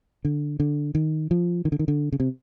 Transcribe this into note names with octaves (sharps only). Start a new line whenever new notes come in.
D3
D3
D#3
F3
D#3
D3
D#3
D3
C#3
C3